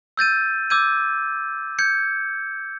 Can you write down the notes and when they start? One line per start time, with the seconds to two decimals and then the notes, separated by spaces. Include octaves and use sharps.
0.17 E6 G6 A6 D#7
0.70 D6 E6 G6 G#6 D#7
1.79 G6 G#6 C#7